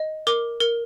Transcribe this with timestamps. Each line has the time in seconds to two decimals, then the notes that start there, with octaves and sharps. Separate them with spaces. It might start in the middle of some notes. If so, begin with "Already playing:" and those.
Already playing: D#5
0.27 A#4 D6
0.60 A#4